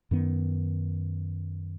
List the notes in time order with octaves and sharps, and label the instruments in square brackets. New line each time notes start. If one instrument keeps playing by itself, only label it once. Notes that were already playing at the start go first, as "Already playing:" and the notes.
[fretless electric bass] F#2 D#3 B3